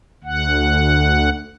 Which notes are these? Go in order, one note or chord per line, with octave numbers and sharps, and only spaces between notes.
D2 F#5